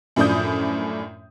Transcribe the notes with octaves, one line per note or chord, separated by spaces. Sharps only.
F#2 A2 F3 D4 D#6 G6